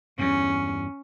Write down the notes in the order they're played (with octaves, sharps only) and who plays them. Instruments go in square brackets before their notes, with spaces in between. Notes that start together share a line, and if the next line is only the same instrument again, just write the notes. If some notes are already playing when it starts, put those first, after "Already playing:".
[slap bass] E2 G2 [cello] C#4